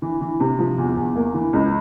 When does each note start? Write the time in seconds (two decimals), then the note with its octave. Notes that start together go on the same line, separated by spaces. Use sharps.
0.02 E3
0.21 E3
0.40 C3
0.59 F3
0.78 E2
0.97 E2
1.16 A#3
1.34 E3
1.53 C#2